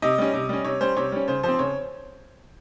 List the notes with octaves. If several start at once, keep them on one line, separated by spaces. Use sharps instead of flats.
C3 D#5
G3 C#4
C3
G3 C#4
C3 C#5
G3 C#4 C5
C3 C#5
G3 C#4
C#3 C5
F3 C4 C5
C#3 C#5